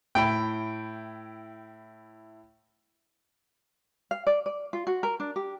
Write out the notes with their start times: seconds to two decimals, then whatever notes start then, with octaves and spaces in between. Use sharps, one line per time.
0.15 A2 E4 G5 B5
4.11 F5
4.27 D5
4.46 D5
4.73 F4
4.87 F#4
5.03 A#4
5.20 D4
5.36 G4